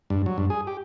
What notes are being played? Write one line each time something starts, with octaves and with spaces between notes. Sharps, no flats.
G2
F#3
G2
G#4
G4